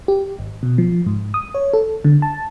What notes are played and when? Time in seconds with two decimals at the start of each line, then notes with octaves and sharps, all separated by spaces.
0.08 G4
0.39 G#1
0.63 B2
0.78 F3
1.06 G#2
1.34 D#6
1.55 C#5
1.73 A4
2.04 D3
2.22 A5